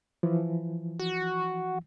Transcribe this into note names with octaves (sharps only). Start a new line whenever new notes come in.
E3 F3
F#4